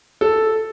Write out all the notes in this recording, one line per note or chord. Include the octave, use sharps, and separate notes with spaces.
A4